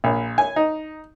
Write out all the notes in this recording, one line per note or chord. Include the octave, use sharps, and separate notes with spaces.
A#1
G#5
D#4